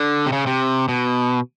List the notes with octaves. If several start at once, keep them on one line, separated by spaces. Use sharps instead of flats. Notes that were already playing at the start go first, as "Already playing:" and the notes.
Already playing: D3
C3
C#3
C3
B2